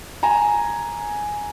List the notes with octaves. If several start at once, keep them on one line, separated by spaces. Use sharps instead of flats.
G#5 A#5